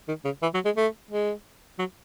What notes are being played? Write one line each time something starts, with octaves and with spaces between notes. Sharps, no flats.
D#3
C#3
E3
F#3
G#3
A3
G#3
F#3